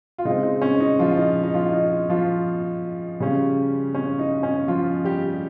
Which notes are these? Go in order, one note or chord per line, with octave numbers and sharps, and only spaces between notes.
F4
C#3 G#3 C4 D#4
D#4
C#4
D#4
F3 F4
D#4
D#4
F3 F4
D#4
F3 F4
C#3 G3 C#4
C#4
D#4
C#4
F3 F4
G3 G4